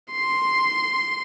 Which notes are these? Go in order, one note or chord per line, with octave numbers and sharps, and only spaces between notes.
C6